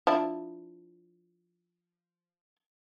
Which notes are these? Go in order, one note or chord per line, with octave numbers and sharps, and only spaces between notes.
F3 D4 E4